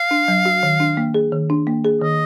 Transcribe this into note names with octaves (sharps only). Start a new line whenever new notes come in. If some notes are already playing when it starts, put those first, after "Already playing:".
Already playing: F5
D4
F#3
F#4
D#3
D4
A#3
G#4
D#3
D4
A#3
G#4
D#3 D#5